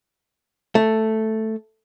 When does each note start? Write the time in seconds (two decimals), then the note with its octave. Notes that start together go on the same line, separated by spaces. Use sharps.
0.75 A3